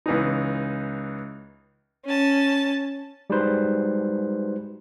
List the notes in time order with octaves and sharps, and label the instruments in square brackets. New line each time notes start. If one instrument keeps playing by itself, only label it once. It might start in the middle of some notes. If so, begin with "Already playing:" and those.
[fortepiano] C#2 E3 D#4
[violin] C#4 A5
[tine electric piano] G3 G#3 D#4 F#4 B4 C5